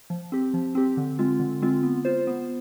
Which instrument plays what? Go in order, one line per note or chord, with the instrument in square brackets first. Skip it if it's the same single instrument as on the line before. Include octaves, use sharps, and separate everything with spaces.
[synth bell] F3
C4 G4
F3
C4 G4
D3
G#3 C4 F4
D3
G#3 C4 F4
B3
F4 C5
B3